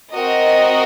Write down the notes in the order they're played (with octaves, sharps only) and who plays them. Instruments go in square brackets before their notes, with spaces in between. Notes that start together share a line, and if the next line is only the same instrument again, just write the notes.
[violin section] C4 F#4 A#4 D#5